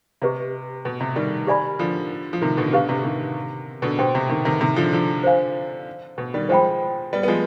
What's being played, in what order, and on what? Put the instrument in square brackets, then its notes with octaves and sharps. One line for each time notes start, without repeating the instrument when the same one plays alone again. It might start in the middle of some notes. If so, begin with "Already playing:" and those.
[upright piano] C3 [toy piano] G4 B4 D#5
[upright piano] B2
C3
D#3 G3
[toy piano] G4 D5 G#5 B5
[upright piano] D3 F3
F3
C3 D#3
B2 D3
[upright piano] B2 D3 [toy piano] G4 B4 F5
[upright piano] C3
C3 D#3
B2 D3
[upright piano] B2 [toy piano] G4 C5 G5 C6
[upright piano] C3
C3 D#3
C3 D#3
C3 D#3
D3 F3
D3 F3
[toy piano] C5 F5 G#5
[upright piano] B2
D#3 G3
[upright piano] F3 G#3 [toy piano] C5 G5 B5
[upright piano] G3 B3
B3
F3 G#3